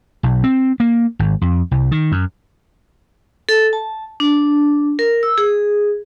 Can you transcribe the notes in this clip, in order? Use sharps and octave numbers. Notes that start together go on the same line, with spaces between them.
B1
C4
A#3
G#1
F2
C2
D#3
F#2
A4
A5
D4
A#4
E6
G#4